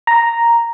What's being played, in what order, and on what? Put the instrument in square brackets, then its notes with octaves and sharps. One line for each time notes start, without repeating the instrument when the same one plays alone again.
[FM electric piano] A#5